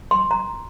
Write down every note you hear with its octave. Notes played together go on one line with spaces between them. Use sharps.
C6
A#5